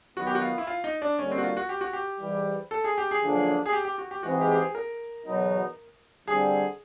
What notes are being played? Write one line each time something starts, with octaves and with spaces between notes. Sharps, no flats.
D#3 F#3 B3 F#4
G4
F#4
F4
E4
F4
D#4
D4
D3 G3 A#3 C#4 D#4
C4
F#4
F4
F#4
G4
F#4
G4
G#2 E3 G3
A4
G#4
G4
G#4
F#2 D3 F3 A#3 D4
G#4
G4
G4
F#4
G4
G#2 E3 G#3 C4 F#4
G4
G4
G#4
A#4
E2 B2 F#3 B3 D#4
D3 G3 C4 G#4